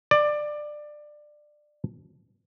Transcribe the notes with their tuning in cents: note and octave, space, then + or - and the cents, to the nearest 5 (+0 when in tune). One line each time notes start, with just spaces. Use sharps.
D5 +20